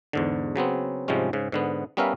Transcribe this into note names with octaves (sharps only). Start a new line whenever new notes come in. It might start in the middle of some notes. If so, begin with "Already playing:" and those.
E2 G#2 D3
C#3 F#3 B3 C4
G#2 C3 F3 G3 G#3 C#4
G#2 C#3
G#2 D3 B3
G3 B3 C#4 A#4 E5 F5